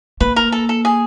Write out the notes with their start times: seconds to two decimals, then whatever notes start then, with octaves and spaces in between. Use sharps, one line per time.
0.20 A#3 B4
0.36 A#4
0.52 A4
0.69 A4
0.85 G#4